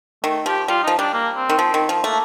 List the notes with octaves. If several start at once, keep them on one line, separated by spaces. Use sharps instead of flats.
D#3 A3
F3 G4
G3 F4
F3 D#4
G3 D4
A#3
C4
D#3
F3
D#3
F3
A3 A#3